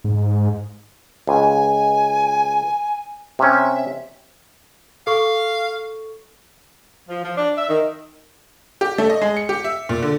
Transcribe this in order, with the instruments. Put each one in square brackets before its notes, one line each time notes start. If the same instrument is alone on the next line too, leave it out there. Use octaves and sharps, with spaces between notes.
[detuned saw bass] G#2
[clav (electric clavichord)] C#2 [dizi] G#5
[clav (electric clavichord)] C3 C#4 [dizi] E5
[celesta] A4 C#6 [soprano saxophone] F5
[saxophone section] F3
F3
D4
E5
D#3
[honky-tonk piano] G4
A3
D#5
G#3
C#7
G4
E5
A#2
D3